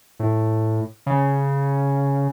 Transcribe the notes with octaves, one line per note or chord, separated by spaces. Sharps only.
A2
C#3